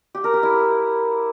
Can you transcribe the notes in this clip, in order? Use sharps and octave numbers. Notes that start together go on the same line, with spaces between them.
G4
A#4
G4
E4